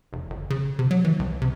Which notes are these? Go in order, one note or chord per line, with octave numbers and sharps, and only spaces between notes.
F1
G1
C#3
C3
F#3
E3
C2
C3